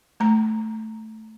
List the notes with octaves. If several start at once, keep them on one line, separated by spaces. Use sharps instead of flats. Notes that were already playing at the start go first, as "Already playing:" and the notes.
A3 A#5